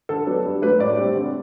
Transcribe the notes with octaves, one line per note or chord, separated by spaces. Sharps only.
D3 A4
F#3 B3 D4
G2
F#3 A3 D4 B4
A2 D5
G3 C4
D3